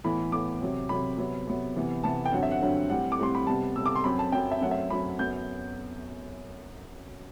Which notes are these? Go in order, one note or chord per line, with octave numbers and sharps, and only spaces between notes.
A2 E3 B3 B5
A2 E3 B3 D6
C3 F#3 C4
C3 F#3 C4 B5
C3 F#3 B3
C3 F#3 B3
C3 E3 B3
C3 E3 B3 A5
G5
G2 D3 F#3 C4 F#5
E5
F#5
G2 D3 F#3 C4
A2 G3 C4 F#5
D6
A2 G3 C4 C6
B5
C3 G3 B3 A5
C3 G3 B3 E6
D6
C6
F#2 F#3 C4 B5
A5
F#2 F#3 C4 G5
E5
F#2 F#3 A3 C4 F#5
E5
F#2 F#3 A3 C4 B5
F#2 F#3 B3 G6